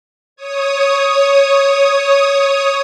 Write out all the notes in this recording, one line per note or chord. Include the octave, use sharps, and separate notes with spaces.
C#5 D#6